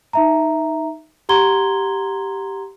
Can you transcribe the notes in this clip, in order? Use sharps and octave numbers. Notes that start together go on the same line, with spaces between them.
D#4 E5 A#5
G4 F#5 A#5 C6 G#6 G7